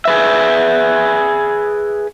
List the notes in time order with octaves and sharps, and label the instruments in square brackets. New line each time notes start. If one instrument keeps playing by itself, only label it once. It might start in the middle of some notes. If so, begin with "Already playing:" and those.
[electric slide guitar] G#4 B4 E5